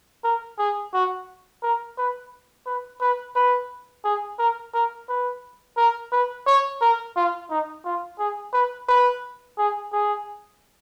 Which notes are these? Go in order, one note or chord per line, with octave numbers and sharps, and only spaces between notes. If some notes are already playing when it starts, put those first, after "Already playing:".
A#4
G#4
F#4
A#4
B4
B4
B4
B4
G#4
A#4
A#4
B4
A#4
B4
C#5
A#4
F4
D#4
F4
G#4
B4
B4
G#4
G#4